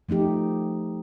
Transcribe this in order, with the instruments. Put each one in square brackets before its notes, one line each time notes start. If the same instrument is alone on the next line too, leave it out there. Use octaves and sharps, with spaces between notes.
[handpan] F3 A3 D#4 G4